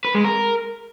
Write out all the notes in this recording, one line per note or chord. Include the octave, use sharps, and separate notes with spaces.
B4
G#3
A#4